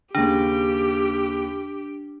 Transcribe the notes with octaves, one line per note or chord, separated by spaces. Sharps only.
D#2 C#3 D4 G4